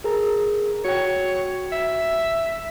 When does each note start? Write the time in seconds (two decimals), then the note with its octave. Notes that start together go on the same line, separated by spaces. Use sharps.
0.04 G#4 A#4 A#5
0.85 F#4 C#5 G5
1.72 E5